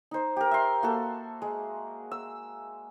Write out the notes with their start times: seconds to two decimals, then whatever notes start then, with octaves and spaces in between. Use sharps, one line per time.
0.11 D#4 C5
0.37 G4 A#4
0.51 E5 C6
0.83 A#3 F#4 A4
1.42 G#3
2.11 E6